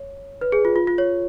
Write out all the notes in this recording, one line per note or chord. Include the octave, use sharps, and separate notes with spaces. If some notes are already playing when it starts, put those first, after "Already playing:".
Already playing: C#5
B4
G#4
F4
F4
F4
C#5